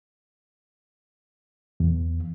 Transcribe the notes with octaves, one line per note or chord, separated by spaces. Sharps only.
E2